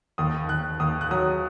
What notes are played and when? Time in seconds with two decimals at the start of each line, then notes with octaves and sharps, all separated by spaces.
0.18 D#2 D#6
0.49 D#2 F#6
0.80 D#2 D#6
1.01 F#6
1.11 F#3 D#6